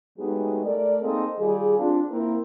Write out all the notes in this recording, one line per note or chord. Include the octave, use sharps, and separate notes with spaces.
F#3 G#3 A3 B3 D#4 G4
A3 A#4 D5
A#3 C4 D#4 G#4 A4 D#5
D#3 G3 F4 G4 G#4
C4 D4 F4
A#3 C4 E4 A#4